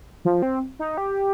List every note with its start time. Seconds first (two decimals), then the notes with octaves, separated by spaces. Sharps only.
0.25 F3
0.42 C4
0.79 D#4
0.97 G4